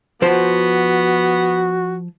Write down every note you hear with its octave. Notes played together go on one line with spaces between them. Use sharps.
F3 B3 F#4 C5